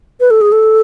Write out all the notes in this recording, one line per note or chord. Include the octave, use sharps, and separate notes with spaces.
B4
A4
G#4
A4